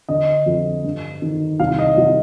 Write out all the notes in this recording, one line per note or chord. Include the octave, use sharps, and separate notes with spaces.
D3 D#5
F2
G2
D#3
C2 F5
D#5
C2